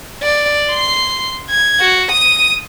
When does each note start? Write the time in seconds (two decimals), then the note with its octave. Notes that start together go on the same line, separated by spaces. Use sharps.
0.23 D5
0.69 C6 C7
1.50 G#6
1.80 F#4
2.11 D#6 D#7